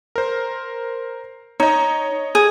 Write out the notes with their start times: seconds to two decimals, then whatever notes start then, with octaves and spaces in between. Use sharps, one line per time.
0.16 A#4 C5
1.60 D#4 C#5 D#5
2.35 G#4